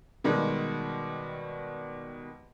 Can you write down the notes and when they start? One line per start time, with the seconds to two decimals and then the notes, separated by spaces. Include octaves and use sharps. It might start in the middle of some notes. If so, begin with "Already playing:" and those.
0.24 B2 D#3 G3 G#3